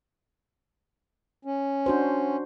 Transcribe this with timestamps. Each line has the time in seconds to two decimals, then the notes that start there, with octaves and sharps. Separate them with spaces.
1.45 C#4
1.86 D4 F#4 C5